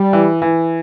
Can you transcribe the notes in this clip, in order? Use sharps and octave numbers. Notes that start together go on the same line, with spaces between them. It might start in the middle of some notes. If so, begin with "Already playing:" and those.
Already playing: G3
E3
E3